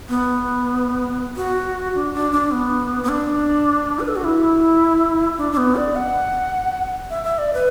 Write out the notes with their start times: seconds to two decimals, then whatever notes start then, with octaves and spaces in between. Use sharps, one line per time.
0.09 B3
1.37 F#4
1.95 D4
2.14 D4
2.32 D4
2.51 B3
3.03 B3
3.09 D4
4.00 B4
4.08 A4
4.16 F#4
4.24 E4
5.38 D4
5.52 D4
5.57 B3
5.76 D5
5.96 F#5
7.10 E5
7.24 E5
7.38 D5
7.54 B4